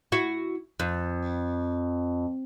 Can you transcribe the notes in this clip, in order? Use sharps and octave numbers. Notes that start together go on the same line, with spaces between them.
E4 F#4
F2